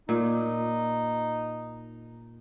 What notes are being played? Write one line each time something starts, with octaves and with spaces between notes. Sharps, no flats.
A#2 D#4